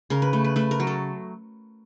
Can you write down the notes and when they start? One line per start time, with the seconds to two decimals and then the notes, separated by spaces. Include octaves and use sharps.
0.10 C#3 A#4
0.22 B4
0.33 A3
0.44 B4
0.56 A3 B4
0.71 A#4
0.80 F#3
0.87 A4